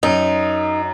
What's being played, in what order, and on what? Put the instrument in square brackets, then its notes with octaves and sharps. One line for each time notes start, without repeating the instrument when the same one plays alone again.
[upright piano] F#2 [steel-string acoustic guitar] D#4